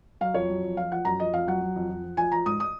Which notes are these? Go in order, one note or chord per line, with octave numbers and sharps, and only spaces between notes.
F#3 F5
F2 C#5
F#3
F2
F3 F5
F3 F#5
F#2 A#5
F3 D#5
F2 F5
F#3 F#5
F#3
F2
F2
F3
F3 G#5
F3 A#5
G#2 D#6
D#6